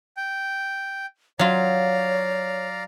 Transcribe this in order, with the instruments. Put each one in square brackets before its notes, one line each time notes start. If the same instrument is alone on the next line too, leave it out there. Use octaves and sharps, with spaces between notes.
[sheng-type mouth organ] G5
[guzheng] F#3 F4 [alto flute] C#5 [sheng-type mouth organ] D5 F5 A#5